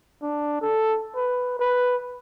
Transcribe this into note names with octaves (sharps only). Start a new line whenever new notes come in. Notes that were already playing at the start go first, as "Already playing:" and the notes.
D4
A4
B4
B4